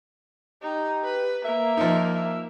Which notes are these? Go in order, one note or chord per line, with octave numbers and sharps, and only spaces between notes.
D#4 G4
B4
A#3 E5
F3 D#4
E5